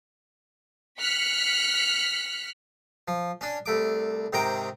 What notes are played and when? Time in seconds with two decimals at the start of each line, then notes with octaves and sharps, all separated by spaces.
1.00 F6 F#6 B6 C#7
3.08 F3
3.41 C#4 D4
3.66 C2 A3 D6
4.33 G#2 C3 D#3 G5 A#5 D6